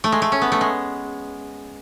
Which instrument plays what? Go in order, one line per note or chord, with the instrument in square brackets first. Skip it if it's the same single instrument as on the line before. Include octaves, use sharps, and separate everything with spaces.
[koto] A3
G#3
A3
C#4
B3
A3
G#3